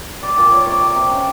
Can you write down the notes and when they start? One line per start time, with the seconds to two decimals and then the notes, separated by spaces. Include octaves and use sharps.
0.22 G3 D5
0.37 A#2 D5
0.52 A#2 C#5
0.67 C3 D5
0.81 C3
0.96 C3
1.10 C#3